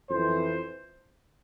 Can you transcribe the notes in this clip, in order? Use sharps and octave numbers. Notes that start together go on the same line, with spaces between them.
F2 E3 C5